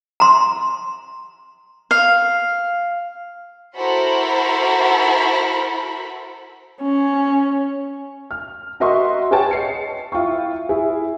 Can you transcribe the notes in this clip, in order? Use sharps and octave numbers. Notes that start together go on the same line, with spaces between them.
A#5 C6
F5
E4 F#4 A4 A#4 C5 B5
C#4
F6
F#4 A#4 D#5 E5 C6 C#6
G#4 B4 C#5 F#5 G5 A5
D#5 C7 C#7
E4 F4 G5 C#6
E4 G#4